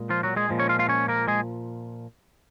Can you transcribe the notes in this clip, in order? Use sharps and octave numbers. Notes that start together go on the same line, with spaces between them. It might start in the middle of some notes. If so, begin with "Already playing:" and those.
Already playing: A#2 G#3
F3 F4
F#3 F#4
G#3 G#4
A#2 F3 G#3
C#4 C#5
F4 F5
F4 F5
C#4 C#5
A#3 A#4
G#3 G#4